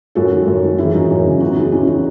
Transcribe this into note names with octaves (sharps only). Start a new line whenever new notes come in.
F#2 F#4 A4
D#3
F#2
D#3
E3 E4 G#4
F#2 D#4 F#4
F#2
C#3
E2 D#4 F#4
D#3 E4 G#4
E2 C#4 E4
D#3 D#4 F#4